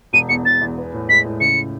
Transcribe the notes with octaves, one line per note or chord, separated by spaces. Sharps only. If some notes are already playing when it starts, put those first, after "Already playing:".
E1 D#7
E2 C#7
E1 A6
E2
B3
A2
G#3 B6
A2
C#2 C#7